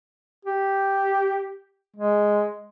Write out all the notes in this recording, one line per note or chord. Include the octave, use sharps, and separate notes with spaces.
G4
G#3